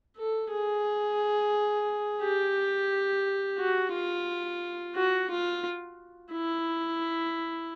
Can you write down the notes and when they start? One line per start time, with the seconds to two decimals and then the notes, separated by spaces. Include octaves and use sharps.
0.17 A4
0.51 G#4
2.22 G4
3.59 F#4
3.93 F4
4.95 F#4
5.30 F4
6.33 E4